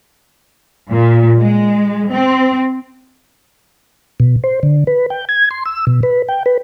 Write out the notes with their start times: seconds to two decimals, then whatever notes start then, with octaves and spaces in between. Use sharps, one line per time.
0.89 A#2
1.40 G#3
2.11 C4
4.20 B2
4.44 C5
4.63 D3
4.87 B4
5.10 G5
5.29 G#6
5.51 C6
5.66 E6
5.87 B2
6.03 B4
6.28 G5
6.46 B4